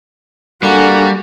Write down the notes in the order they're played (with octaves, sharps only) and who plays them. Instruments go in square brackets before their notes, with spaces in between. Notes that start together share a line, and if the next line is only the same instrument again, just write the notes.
[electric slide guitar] G3 [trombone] A#3 [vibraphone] D4 A4 G#5 [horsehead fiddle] F#4